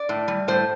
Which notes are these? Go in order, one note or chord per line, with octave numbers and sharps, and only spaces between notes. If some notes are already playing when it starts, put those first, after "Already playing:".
Already playing: D5
A2
G3
A2 C5